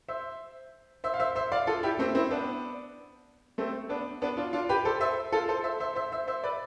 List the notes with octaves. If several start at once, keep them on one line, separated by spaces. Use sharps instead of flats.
C5 E5
C5 E5
F5
C5 E5
C5 E5
D5 F5
F4 A4
E4 G4
A3 C4
C4 E4
B3 D4
A3 C4
B3 D4
B3 D4
D4 F4
D4 F4
G4 B4
A4 C5
C5 E5
F4 A4
A4 C5
C5 E5
C5 E5
C5 E5
C5 E5
C5 E5
B4 D5